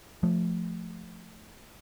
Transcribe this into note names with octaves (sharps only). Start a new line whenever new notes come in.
F3 A3